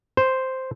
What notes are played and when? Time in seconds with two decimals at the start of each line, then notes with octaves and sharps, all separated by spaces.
0.17 C5